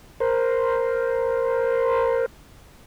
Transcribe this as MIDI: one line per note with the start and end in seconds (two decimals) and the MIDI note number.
0.20 2.26 70
0.20 2.26 72